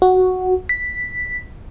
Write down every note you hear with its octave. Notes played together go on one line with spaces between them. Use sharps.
F#4
B6